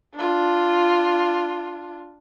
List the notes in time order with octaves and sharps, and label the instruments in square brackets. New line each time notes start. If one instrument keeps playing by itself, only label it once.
[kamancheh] D4 F4